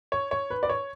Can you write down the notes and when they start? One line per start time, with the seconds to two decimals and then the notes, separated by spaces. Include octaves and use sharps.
0.12 C#5
0.31 C#5
0.50 B4
0.63 D5
0.69 C#5